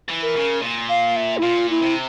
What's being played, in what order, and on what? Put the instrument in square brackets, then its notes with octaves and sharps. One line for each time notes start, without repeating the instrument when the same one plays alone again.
[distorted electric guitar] E3
[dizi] A#4
[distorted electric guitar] C#3
A#2
[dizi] F5
E5
E4
[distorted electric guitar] A#2 [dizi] F4
[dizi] E4
[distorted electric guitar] C3